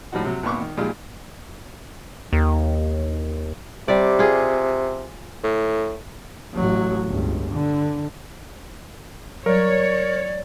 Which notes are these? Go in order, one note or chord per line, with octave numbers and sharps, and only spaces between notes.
A2 F3 G3 D#4 F#4
C3 F#3
G#1 A#2 B3 C#6 D6
D#3
A#2 F3 G3 G#3 D#4 F4
D#2
C3 G3 D5
F4 G#4
A2
A1 F#3
G1 C#2
D3
F#3 G3 A#4 C#5 D5